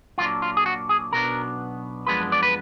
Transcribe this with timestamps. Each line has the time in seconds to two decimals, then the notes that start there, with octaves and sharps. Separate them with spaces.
0.18 A#2 F#3 A#3 D4 F4
0.42 F4
0.57 G#4
0.66 F#4
0.89 G#4
1.12 B1 B2 F#3 B3 D4 A#4
2.07 F#2 F3 G#3 B3 D4 B4
2.32 D5
2.43 B4